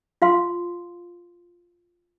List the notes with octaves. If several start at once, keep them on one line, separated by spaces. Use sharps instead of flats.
F4 F5 C6